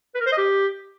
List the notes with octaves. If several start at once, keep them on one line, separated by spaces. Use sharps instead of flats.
B4
A#4
C5
D#5
G4